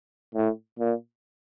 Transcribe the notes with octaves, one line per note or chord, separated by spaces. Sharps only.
A2
A#2